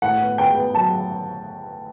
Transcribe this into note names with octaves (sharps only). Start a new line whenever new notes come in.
A2 F#5
B3
B3 G5
B3
F#3 A5